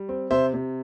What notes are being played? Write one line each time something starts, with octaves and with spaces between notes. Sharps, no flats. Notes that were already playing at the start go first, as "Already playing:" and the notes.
Already playing: G3
C4
C3 C5 E5
C3